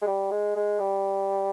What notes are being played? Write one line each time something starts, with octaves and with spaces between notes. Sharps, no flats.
G#3
G3
G#3
G#3
G3